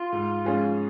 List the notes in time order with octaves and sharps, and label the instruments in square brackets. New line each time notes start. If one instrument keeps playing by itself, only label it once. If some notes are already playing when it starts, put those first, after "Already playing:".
Already playing: [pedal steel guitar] F4
[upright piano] G#2
F3 G#3 C#4 G#4